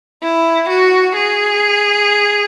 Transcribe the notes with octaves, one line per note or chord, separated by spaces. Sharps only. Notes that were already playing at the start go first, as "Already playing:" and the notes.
E4
F#4
G#4